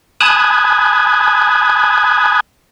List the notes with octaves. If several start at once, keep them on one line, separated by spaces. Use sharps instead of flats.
G#5 A5 B5 D#6 F#6 G#6